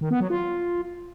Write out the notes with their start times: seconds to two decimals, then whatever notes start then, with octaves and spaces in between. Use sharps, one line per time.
0.01 D#3
0.11 B3
0.20 F#3
0.30 F4